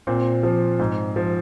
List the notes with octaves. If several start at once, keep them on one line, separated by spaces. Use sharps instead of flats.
A#2 C4
F3
G#2
F3